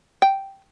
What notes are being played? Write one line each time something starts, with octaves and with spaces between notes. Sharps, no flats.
G5